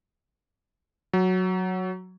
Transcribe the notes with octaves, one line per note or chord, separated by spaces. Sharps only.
F#3